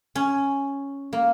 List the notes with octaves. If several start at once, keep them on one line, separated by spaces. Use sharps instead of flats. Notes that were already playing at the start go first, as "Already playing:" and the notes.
C#4
A#3